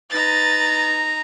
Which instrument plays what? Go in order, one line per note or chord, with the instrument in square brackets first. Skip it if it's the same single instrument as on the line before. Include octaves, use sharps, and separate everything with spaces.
[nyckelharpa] D#4 A#5 [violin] B4 A6